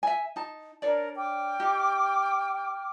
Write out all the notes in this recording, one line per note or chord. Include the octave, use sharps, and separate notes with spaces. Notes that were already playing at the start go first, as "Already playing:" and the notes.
E5 G#5
D#4 A5
D4 A#4 C#5 D5 A5
G5 D6 F6
D#4 G4